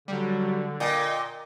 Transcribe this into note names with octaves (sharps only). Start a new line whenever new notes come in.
D3 F#3 G3
A#2 D#5 G5